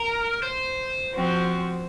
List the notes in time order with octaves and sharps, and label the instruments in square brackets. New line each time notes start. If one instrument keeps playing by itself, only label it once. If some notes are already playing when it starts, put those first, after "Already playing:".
Already playing: [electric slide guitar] A#4
C5
[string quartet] F3 C4 F#4